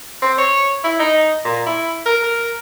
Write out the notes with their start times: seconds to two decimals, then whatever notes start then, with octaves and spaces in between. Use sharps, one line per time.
0.22 C4
0.38 C#5
0.84 E4
0.99 D#4
1.44 A#2
1.66 E4
2.06 A#4
2.23 A#4